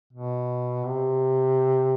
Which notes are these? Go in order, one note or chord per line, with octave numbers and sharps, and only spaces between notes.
B2
C3